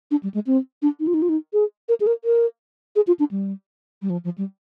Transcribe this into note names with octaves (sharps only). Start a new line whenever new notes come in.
D4
G3
G#3
C4
D4
D#4
F4
D#4
F4
D#4
G#4
A#4
G#4
A#4
A#4
G#4
F4
D4
G3
G3
F3
F3
G3